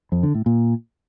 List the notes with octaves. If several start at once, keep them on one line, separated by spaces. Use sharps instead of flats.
F2
D3
A2
A#2